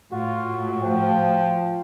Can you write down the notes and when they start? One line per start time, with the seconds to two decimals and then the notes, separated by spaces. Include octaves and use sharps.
0.12 A2 F4 F#4
0.83 F3 G5